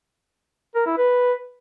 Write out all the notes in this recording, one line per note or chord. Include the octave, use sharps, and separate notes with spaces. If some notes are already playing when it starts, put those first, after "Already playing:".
A#4
E4
B4